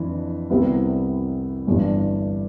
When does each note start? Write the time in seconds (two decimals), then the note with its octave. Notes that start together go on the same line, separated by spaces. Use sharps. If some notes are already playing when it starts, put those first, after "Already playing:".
Already playing: F2 E3 D4
0.50 C2 C3 G3 B3 E4
1.67 G1 G2 E3